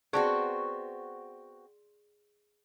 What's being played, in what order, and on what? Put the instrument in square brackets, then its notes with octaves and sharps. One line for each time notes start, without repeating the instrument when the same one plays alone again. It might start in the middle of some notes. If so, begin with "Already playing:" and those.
[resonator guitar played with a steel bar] B3 C4 F#4 [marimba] G#4 D5 A5 [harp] C6 C#6